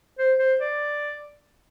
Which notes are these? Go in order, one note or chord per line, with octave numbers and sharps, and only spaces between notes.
C5
C5
D5